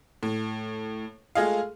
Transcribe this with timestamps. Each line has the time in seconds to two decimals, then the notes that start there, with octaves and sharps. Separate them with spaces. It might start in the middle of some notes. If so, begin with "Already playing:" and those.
0.23 A2
1.35 G#3 A3 F4 G#4 D#5 F5